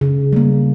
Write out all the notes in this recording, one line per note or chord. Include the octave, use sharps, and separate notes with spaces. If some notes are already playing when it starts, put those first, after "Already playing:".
C#3
G3 A#3